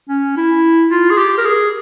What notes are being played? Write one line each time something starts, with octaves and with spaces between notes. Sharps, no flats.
C#4
E4
F4
G#4
G4
A#4
G#4